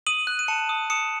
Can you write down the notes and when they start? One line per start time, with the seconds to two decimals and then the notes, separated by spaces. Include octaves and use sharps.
0.07 D#6 D#7 F#7
0.27 F#6
0.39 D#7
0.48 A5 C#7 E7
0.69 D#6
0.90 D#6 C#7 E7